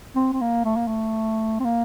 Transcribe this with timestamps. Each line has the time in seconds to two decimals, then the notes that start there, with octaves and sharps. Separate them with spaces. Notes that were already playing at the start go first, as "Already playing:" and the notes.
0.16 C4
0.33 C4
0.41 A#3
0.65 A3
0.76 A#3
0.87 A3
1.60 C4
1.65 A#3